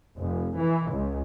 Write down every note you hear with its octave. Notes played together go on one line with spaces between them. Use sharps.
F1
E3
C#2